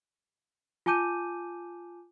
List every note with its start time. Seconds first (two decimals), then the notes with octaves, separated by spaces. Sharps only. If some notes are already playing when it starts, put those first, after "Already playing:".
0.86 F4 G#5 A5 D6 G6 D#7